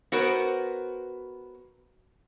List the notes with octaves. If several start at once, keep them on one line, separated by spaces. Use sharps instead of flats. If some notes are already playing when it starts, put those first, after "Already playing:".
B3 F#4 A#4 C5